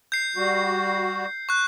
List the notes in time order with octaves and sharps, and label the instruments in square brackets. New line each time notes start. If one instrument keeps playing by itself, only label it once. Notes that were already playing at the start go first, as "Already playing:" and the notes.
[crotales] G6 C7
[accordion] G3 F#4
[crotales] C#6 F#6